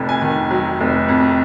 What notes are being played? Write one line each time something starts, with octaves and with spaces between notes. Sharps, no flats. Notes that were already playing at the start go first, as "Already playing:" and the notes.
Already playing: F1 F2
G#5
D#3
F#3
F1
F2